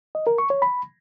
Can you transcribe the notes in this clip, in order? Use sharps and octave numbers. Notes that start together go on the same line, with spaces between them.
D#5
A#4
C#6
C#5
B5